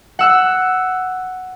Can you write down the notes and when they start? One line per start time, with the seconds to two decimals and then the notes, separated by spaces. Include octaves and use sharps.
0.19 F#5 E6 F#6